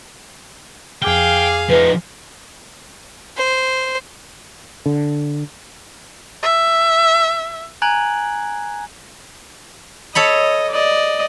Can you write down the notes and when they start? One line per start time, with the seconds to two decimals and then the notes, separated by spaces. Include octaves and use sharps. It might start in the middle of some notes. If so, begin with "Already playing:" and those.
1.02 F2 G#4 F5 G5 D6 F6
1.70 F3 D#4 B4
3.37 C5
4.86 D3
6.42 E5
7.82 G#5 A#5 F#6 G#6 D7 F#7
10.15 A4 C#5 D#5 B5
10.71 D5 D#5